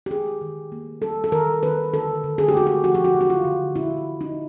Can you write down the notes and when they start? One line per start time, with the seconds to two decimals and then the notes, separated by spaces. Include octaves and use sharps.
0.06 G4
0.11 D#3 G#4
0.41 D#3
0.72 A#3
1.02 G3 A4
1.24 A4
1.32 D#3 A#4
1.62 D#3 B4
1.93 D3 A4
2.24 D3
2.38 G#4
2.48 G4
2.54 A3 F#4
2.67 G4
2.84 F3 F#4
2.95 G4
3.05 F#4
3.15 D3
3.21 F#4
3.30 F4
3.45 D3
3.76 A#2 E4
4.05 A#2
4.21 D#4